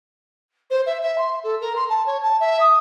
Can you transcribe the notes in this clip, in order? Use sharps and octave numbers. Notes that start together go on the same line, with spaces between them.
C5
E5
E5
C6
A4
A#4
C6
A5
C#5
A5
E5
D#6